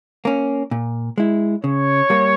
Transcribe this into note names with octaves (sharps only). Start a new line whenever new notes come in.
A#3 C#4
A#2
G#3 E4
C#3 C#5
G3 A#3